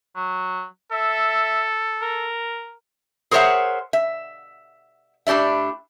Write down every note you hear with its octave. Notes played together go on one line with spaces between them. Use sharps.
F#3
A4 E5
A#4
G#4 A#4 C5 C#5 E5 F#5
E5
A2 D4 G4 D5 E5